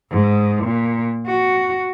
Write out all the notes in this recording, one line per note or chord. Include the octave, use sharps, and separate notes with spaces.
G#2
A#2
F#4